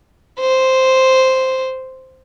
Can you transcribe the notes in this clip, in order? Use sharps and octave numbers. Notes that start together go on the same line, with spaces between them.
C5